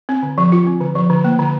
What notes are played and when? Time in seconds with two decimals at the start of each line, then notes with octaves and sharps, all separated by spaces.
0.09 C4
0.23 D3
0.38 F3
0.52 F4
0.67 C4
0.81 D3
0.95 F3
1.10 D3
1.24 A#3
1.39 D3